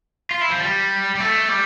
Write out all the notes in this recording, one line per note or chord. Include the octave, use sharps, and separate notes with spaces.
F4
E4
F3
G3
G3
A3
G3